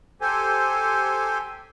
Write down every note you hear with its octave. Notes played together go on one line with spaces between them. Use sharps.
G4 A4 C5 G#5